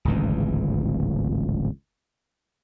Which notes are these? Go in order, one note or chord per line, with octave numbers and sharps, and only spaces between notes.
D1 G#1 C#2 E3